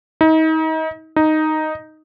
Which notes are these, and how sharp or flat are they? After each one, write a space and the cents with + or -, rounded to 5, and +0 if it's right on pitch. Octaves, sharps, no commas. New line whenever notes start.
D#4 +35
D#4 +0